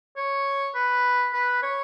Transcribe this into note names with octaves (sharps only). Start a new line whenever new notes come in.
C#5
B4
B4
C#5